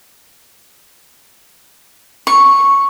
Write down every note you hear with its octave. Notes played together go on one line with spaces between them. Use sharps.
C#6